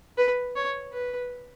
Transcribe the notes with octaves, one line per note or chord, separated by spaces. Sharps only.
B4
C#5
B4